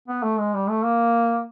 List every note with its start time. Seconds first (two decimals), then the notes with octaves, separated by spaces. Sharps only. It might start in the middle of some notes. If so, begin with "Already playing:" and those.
0.08 B3
0.23 A3
0.39 G#3
0.54 G3
0.69 A3
0.85 A#3